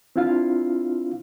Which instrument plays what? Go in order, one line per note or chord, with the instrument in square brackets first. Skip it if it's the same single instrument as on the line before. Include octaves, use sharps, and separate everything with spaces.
[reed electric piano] C4 D4 E4 F4 F5